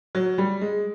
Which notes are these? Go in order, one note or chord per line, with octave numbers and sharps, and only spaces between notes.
F#3
G3
G#3